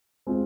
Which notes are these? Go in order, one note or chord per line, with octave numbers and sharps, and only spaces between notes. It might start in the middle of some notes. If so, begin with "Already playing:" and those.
G#3 C4 F4 G#4